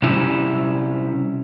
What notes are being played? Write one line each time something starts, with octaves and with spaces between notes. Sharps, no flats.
C3 G3 C#4 E4